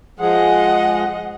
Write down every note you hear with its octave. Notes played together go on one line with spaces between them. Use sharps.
F3 G#3 G#4 D#5 F#5